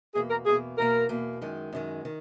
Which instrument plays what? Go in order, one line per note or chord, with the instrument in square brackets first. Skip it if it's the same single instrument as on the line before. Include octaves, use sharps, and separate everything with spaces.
[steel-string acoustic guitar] E2 B2 A#3 [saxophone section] G#4
[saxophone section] A#4
[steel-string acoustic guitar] E2 B2 A#3 [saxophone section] G#4
[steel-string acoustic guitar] E2 B2 A#3 [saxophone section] A#4
[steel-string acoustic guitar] E2 B2 A#3
F#2 D#3 G#3
F#2 D#3 G#3
D#3